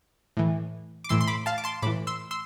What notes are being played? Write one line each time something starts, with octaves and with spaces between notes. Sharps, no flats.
A2 E3
D6
A2 E3 C6 E6
C6
B5 D6
F5 A5
D6
A5 C6
A2 E3 B5 D6
C6 E6
C6 E6